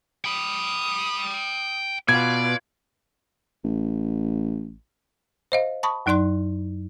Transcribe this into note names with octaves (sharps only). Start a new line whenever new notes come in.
G5 B5 D#6
B2 F4 B4 D5 G#6
A1
C5 D#5 F5
A5 B5 C#6 D#6
F#2 F#3 D#4 D5 C6 F#6